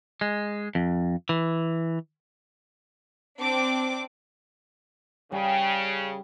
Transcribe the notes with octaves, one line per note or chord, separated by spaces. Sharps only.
G#3
F2
E3
C4 D4 D6
C#3 G3